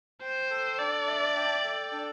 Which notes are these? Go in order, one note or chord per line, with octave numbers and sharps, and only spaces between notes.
C5 G5
A4
D4 D5
E5
G5
A4
D4